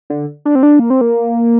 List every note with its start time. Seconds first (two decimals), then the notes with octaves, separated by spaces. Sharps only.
0.10 D3
0.45 D4
0.55 C4
0.63 D4
0.79 A#3
0.90 C4
1.01 A#3